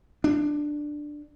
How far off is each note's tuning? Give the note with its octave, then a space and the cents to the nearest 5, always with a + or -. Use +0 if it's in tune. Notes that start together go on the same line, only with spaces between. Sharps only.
D4 +10